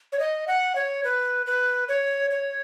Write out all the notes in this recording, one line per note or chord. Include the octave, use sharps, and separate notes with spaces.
C#5
D#5
F#5
C#5
B4
B4
C#5
C#5